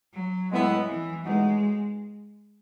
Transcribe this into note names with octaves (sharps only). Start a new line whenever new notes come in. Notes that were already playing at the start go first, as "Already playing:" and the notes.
F#3
A2 G#3 B3 E4
E3
A2 E3 G#3 B3 D#4 F#4